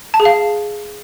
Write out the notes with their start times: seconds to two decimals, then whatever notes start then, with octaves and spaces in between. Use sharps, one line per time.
0.14 A5
0.20 G#4
0.25 F5